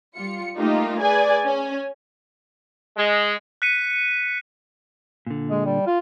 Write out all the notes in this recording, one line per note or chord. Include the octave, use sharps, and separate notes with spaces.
G3 F4 C#7
A3 A#3 D#4 F4 G4
G#4 B4 D5 G#5
C#4 G#5
G#3
F#6 B6 C#7 D#7
A#2 D3
G#3
G3
F4